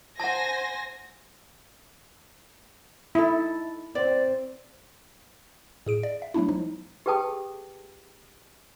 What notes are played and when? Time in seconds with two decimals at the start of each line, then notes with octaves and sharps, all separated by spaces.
0.20 C5 F#5 G#5 A5 A#6
3.15 D#4 E4 A4
3.95 C4 D5
5.87 A2 G#4 D7
6.03 D5
6.22 E5
6.34 F#3 A3 B3 D4 E4
6.48 F3 F#3 G#3 D#4
7.06 G4 G#4 B4 G5 A5 D#6